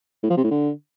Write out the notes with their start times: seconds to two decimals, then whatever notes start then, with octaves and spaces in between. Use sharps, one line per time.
0.23 A2
0.30 F3
0.37 C3
0.44 A2
0.51 D3